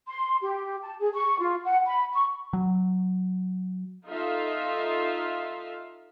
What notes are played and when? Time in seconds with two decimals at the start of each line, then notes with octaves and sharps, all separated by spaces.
0.07 C6
0.42 G4
0.82 A5
1.00 G#4
1.14 C#6
1.39 F4
1.64 F#5
1.86 B5
2.13 C#6
2.53 F#3
4.08 D#4 F4 A4 E5 F5